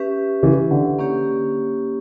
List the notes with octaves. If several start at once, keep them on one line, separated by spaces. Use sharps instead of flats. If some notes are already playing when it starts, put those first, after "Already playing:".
Already playing: C#4 G4 B4 E5
C#3 E3
D3
A#3 C#4 G4 C#5